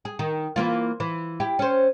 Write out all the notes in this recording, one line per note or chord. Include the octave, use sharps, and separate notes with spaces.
G#4
D#3
E3 A#3 F4
E3
E4 G4
C#4 C5